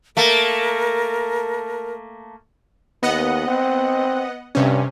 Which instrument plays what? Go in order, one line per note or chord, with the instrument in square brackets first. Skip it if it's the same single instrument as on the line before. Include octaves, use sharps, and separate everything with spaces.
[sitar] A3 A#3 [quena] A#4
[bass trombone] D#2 [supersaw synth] B3 D#5 F#5
[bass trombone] C4
[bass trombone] G2 [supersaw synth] C3 C#4